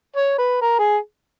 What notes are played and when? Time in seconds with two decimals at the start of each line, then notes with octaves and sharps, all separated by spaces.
0.16 C#5
0.38 B4
0.62 A#4
0.79 G#4